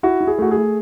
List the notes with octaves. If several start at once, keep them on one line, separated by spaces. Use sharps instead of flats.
E4 F#4
E4
G#4
A3 F#4
G#4
A3